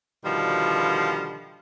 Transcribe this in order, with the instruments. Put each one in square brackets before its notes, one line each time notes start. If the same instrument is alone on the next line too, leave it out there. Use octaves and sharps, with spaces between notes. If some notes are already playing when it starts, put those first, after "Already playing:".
[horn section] B2 D3 D#3 F3 G3